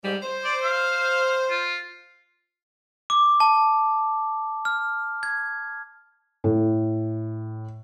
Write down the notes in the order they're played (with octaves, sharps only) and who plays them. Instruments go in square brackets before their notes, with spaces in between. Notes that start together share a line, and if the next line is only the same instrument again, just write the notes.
[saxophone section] G#2 G3
C5
[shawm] D5
F5
F4
[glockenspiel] D6
A5
F6
G#6
[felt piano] A2